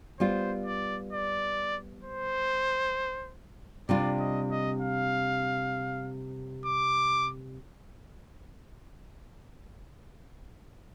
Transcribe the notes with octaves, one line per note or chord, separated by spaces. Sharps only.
G3 B3 F4 C5
D5
D5
C5
C3 G3 D4 F4 D5
D#5
D#5
F5
D6